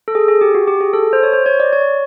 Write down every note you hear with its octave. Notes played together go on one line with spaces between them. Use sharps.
A4
G#4
G#4
G4
F#4
G4
G#4
A4
C5
C#5
C5
C#5
D5
C#5